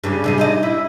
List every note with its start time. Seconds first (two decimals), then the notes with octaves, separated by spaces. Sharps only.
0.04 G2 C#3
0.24 C3 D#4 G#4
0.38 D#4 E4 D#5
0.63 E4